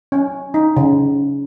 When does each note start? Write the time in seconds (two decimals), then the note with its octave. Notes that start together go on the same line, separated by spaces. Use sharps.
0.12 C#4
0.54 D#4
0.77 C#3